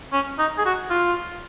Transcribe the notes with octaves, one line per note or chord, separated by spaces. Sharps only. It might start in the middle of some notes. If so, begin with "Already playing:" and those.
C#4
D#4
G#4
F#4
F4